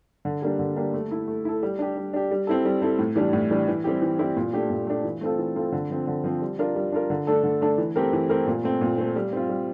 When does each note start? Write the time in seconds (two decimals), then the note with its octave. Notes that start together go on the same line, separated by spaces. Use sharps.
0.25 D3
0.42 G3 A#3 D4 G4
0.59 D3
0.76 G3 A#3 D4 G4
0.94 A3
1.11 E4 A4
1.28 A3
1.45 E4 A4
1.63 G3
1.79 D4 G4
1.97 G3
2.13 D4 G4
2.31 G3
2.47 C4 E4 A4
2.65 G3
2.82 C4 E4 A4
2.99 A2
3.16 E3 G3 D4
3.33 A2
3.51 E3 G3 D4
3.68 E3
3.84 G3 C4 E4 G4
4.02 E3
4.19 G3 C4 E4 G4
4.37 A#2
4.53 A3 D4 G4
4.70 A#2
4.87 A3 D4 G4
5.04 E3
5.21 A3 C4 F4 A4
5.38 E3
5.56 A3 C4 F4 A4
5.72 D3
5.90 F3 C4
6.07 D3
6.24 F3 C4
6.42 G3
6.59 D4 F4 A#4
6.76 G3
6.92 D4 F4 A#4
7.10 D3
7.27 A3 D4 A4
7.44 D3
7.61 A3 D4 A4
7.78 E3
7.96 A3 C4 G4 A#4
8.13 E3
8.29 A3 C4 G4 A#4
8.47 A#2
8.64 A3 C4
8.81 A#2
8.98 A3 C4
9.16 G3
9.33 C4 F4
9.49 G3